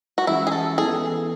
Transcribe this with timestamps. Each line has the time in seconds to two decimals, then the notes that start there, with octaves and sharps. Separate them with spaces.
0.18 F#4
0.27 E3 G#3 C#4 E4
0.47 G#4
0.52 A4
0.77 E3 B3 E4 G#4 A4